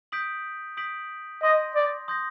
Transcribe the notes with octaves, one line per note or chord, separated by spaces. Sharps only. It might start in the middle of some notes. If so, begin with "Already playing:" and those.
D#6 G6 B6 D7 F#7
D#6 G6 B6 D7 F#7
D#5 C6 D#6 G6 A#6
D5
C6 D#6 G6 A#6